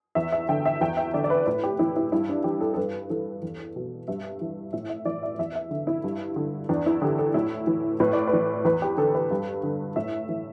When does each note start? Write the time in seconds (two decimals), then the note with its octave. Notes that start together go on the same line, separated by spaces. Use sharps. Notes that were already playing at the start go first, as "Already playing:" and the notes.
0.15 E2 E5
0.32 E5
0.49 D3 G5
0.66 E5
0.81 E2 G5
0.97 E5
1.14 D3 D5
1.24 D5
1.30 B4
1.46 A2 B4
1.63 G4
1.79 E3 E4
1.96 E4
2.12 G2 E4
2.29 D4
2.44 E3 G4
2.61 A4
2.74 A4
2.77 G2 B4
3.10 E3 A4
3.42 E2
3.76 B2
4.08 G2 E5
4.41 E3
4.73 A2 E5
4.89 E5
5.05 E3 D5
5.23 E5
5.39 E2 E5
5.55 E5
5.71 D3
5.87 E4
6.04 G2
6.36 D3
6.69 E2 D4
6.86 E4
7.02 D3 G4
7.19 A4
7.34 A2 E4
7.67 E3
8.00 A2 B4
8.13 D5
8.27 B4
8.33 E3
8.65 E2 B4
8.82 G4
8.97 D3 A4
9.15 B4
9.31 G2
9.63 D3
9.96 A2 E5
10.29 E3